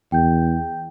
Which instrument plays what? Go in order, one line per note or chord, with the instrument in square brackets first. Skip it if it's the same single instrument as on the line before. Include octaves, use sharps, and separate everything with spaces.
[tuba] E2 [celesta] G5 G6